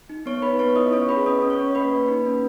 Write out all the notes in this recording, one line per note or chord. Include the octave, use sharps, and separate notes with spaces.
D#4
B3 C#5 C#6
D#4 B4 B5
B3 C#5 C#6
E4 D#5 D#6
C#4 C#5 C#6
G#4 B4 B5
C#4 D#5 D#6
C#4
C#5 C#6
C#4
A#3 B4 B5
A#3
D#4
C#4